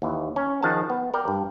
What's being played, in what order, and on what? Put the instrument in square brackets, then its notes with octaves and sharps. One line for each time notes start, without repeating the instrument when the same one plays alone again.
[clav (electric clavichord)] D#2 E3
C#4
D#3 F3 G#4 F#5 A5
B3
A#4 D5 G5
G2